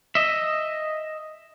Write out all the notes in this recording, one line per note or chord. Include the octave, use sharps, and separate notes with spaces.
D#5 E5